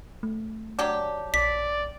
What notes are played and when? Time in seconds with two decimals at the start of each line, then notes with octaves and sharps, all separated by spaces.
0.23 A3
0.79 F#3 D4 G4
1.34 A#1 D5 B6